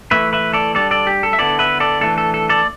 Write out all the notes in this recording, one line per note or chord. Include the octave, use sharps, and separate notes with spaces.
E3 A3 E4 B4 E5
B4 E5
A4 D5
G3 D4 A4 D5
A4 D5
G4
A4
E5
D3 B3 E4 A4 D5
B4 E5
A4 D5
E3 A3 D4 A4
A4
A4
A4 D5